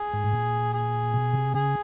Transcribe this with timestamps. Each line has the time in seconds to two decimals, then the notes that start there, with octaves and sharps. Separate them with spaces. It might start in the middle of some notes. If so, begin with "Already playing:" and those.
Already playing: G#4
0.14 G#2
0.24 A2
0.33 A#2
0.73 G#4
1.14 B2
1.33 C3
1.54 C#3 G#4